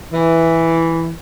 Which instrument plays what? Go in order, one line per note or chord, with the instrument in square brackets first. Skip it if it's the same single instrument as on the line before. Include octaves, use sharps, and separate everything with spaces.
[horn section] E3